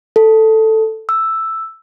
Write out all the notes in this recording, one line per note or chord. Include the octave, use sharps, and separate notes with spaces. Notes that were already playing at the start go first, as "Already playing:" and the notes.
A4
E6